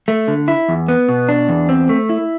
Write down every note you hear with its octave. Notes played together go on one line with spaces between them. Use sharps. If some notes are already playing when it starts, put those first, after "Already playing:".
A3
D3
E4
E2
B3
B2
D4
E2
C4
A3
E4